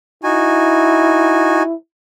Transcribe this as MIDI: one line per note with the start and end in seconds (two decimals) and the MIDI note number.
0.24 1.63 63
0.24 1.74 64
0.24 1.63 66
0.24 1.63 80